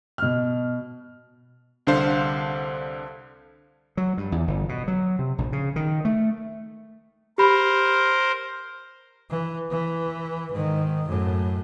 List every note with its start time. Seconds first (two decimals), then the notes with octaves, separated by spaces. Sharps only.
0.18 B2 F6
1.87 C2 D3 D4 C5 F5 C6
3.97 F#3
4.17 G2
4.32 E2
4.47 G1
4.69 B2
4.88 F#3
5.19 C3
5.38 A#1
5.53 C#3
5.76 D#3
6.05 A3
7.38 G4 A#4 C5 B5
9.30 E3
9.70 E3
10.52 G#2 D#3
11.08 F#2 A2